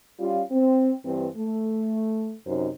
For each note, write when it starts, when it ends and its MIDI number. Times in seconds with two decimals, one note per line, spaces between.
0.19 0.41 55
0.19 0.41 61
0.19 0.41 65
0.50 0.92 60
1.04 1.26 43
1.04 1.26 52
1.04 1.26 60
1.36 2.32 57
2.46 2.68 42
2.46 2.68 48
2.46 2.68 63
2.46 2.68 72